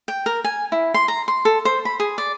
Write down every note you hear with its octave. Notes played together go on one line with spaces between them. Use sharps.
G5
A#4
G#5
E4
C6
A#5
C6
A4
C5
B5
G#4
D5